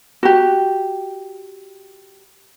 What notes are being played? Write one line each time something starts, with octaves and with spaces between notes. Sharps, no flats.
F#4 G4